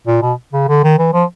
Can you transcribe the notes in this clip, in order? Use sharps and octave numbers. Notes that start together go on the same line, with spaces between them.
A#2
B2
C#3
D3
D#3
E3
F3